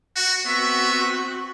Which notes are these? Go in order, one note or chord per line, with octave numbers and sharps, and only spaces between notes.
F#4
B3 C4 F#4 E5